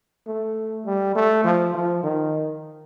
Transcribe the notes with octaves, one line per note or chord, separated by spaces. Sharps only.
A3
G3
A3
F3
F3
D#3